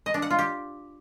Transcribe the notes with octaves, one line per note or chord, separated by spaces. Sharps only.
D#5
D4
F#5
F4
G4